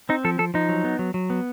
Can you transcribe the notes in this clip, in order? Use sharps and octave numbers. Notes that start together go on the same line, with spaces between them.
C4 D#4
F3 A4
F3 A4
F3 D#4
F#3
B3
F#3
F#3
B3